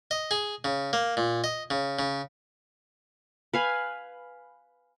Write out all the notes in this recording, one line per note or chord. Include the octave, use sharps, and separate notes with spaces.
D#5
G#4
C#3
A#3
A#2
D#5
C#3
C#3
B4 F5 G#5